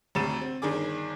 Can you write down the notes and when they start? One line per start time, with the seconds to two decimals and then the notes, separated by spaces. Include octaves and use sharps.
0.15 G#1 D2 C3 A6 D#7 E7
0.41 C4
0.62 G1 D#3 D4 G#4 D6